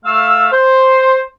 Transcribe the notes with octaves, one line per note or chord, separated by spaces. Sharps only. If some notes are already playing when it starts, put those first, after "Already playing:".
A3 F5 E6
C5